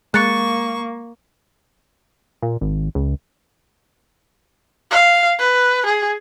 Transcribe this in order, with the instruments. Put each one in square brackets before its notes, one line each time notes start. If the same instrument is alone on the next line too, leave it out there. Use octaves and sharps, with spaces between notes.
[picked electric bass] G#3 [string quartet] A#3 [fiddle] C#6 [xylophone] F#6 A6 C#7
[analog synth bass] A#2
G#1
C#2
[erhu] F5
B4
G#4